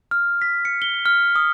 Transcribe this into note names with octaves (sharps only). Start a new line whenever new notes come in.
F6
B6
C#7
G7
F6
D#6